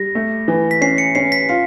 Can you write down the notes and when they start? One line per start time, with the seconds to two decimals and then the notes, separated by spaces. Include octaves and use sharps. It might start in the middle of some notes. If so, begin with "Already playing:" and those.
Already playing: G3 A#6
0.15 A3
0.48 E3
0.71 B6
0.81 C#4 C7
0.98 C#7
1.15 C#4 C7
1.32 B6
1.49 F4 C7